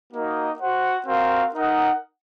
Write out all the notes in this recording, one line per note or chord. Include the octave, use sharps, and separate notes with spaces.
A#3 D#4 F#4 A#4 D#5
F#4 C5 F#5
C4 F#4 A#4 F5
D#4 A#4 D#5 F#5